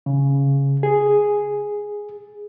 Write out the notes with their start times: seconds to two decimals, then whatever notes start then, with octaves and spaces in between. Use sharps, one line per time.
0.06 C#3
0.83 G#4